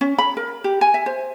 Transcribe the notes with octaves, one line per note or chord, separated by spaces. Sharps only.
C#4
B5
A#4
G4
G#5
E5
C5